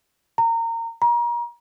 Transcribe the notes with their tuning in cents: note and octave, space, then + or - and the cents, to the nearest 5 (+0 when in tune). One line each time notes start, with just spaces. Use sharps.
A#5 -25
A#5 +35